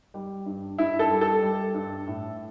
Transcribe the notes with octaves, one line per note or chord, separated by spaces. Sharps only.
G3
G2
G2 E4
A4
G3
A4
G3
G2
A2